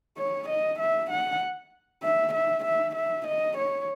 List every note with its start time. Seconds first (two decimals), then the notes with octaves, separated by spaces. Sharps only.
0.17 C#5
0.49 D#5
0.79 E5
1.10 F#5
2.03 E5
2.34 E5
2.65 E5
2.96 E5
3.27 D#5
3.58 C#5